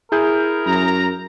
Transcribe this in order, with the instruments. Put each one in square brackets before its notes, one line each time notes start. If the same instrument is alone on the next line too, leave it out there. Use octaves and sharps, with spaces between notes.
[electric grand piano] E4 G#4 G6 [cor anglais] A#4
[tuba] F#2 [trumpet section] A#5